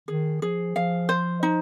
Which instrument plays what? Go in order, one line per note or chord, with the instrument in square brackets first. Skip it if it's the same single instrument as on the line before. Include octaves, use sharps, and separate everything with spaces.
[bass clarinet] D#3 [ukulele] G#4
[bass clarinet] F3 [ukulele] G#4
[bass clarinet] F3 [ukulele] F5
[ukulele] C5
D#4